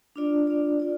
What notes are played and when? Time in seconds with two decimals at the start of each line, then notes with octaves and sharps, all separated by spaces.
0.16 D4 F4 D5
0.47 D4 F4 D5
0.80 F4 D5